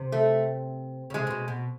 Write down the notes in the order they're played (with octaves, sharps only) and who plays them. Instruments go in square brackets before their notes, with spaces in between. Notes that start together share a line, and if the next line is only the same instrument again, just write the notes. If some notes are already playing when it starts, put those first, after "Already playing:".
Already playing: [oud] C3
[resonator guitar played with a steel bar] A3
[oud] C#3
[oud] C3 [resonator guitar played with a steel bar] G#3
[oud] C3
B2
B2